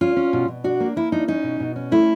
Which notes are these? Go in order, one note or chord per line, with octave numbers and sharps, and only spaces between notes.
C#4 F4
C#4
B2
B2
D4 F#4
A#3
A#3 E4
D4 D#4
C#4 D#4
B2
B2
C#4
A3 E4